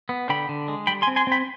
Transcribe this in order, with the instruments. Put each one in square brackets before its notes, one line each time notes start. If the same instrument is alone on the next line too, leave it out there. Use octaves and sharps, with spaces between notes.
[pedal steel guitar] B3
D3 G5 B5
D3
G#3
G3 G5 B5
G#5 C6
C4
G#5 C6
C4 G5 B5